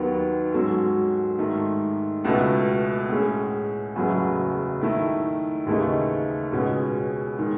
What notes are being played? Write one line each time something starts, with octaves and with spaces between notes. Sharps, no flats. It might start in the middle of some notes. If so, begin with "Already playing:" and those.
Already playing: D#2 D#3 F#3 B3
G#2 F#3 C#4 F#4 A4
G#2 D#3 A3
C#2 B2 A3
A2 G#3 C#4 G#4
F#1 E2 C#3 F#3 A3
D#3 A3 E4
D#2 C#3 E3 A3 D#4
C#2 B2 G#3 C#4
D#3 G#3